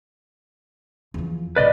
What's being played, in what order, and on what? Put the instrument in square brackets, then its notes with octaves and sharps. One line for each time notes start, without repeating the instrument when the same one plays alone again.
[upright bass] E2 F3
[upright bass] C2 A2 [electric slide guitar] B4 D5 D#5